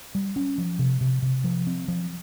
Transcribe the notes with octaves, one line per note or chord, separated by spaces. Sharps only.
G3
C#4
F3
C3
C3
C3
F3
C4
F3